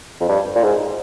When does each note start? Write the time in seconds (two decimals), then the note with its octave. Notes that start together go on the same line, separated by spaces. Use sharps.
0.20 F2
0.29 G2
0.56 A#2
0.63 G#2